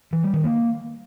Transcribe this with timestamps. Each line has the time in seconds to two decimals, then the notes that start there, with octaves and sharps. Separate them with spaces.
0.13 E3
0.23 G3
0.34 D#3
0.44 A#3